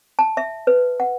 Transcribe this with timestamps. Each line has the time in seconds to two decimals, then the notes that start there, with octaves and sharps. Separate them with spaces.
0.19 A5
0.37 E5
0.67 B4
1.00 F#5